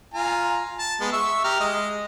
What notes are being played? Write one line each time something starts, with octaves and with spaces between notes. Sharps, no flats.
F4 G#5 A#5
A5
G#3 B3
E5 C#6 E6
G4 A#5 F6
G#3 D#5